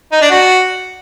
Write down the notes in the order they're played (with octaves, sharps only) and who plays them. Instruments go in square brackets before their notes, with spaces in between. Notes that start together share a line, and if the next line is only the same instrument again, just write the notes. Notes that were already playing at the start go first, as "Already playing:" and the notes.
[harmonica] D#4
D4
F#4